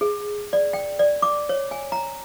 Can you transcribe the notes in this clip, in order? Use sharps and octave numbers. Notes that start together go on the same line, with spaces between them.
G#4
D5
G5
D5
D6
C#5
G#5
A#5